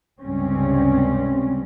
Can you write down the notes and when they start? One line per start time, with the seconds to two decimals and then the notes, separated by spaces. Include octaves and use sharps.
0.20 C#2 G2 C3 G3 C4 C#4